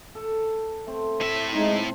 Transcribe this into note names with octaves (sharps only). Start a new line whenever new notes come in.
A4
A3 C4
A2 E5
G#3 C4 D#4